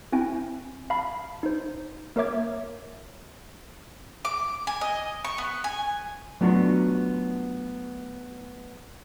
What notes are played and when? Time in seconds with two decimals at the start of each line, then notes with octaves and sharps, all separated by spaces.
0.12 C4 E4 G5 G#5
0.90 F5 A5 B5
1.43 D#4 C5
2.16 A#3 A#4 C#5 E5 D6 G#6
4.25 D6
4.67 G#5
4.81 D#5
5.24 C#6
5.38 B3
5.64 G#5
6.41 F#3 A3 B3 D4 F4 F#4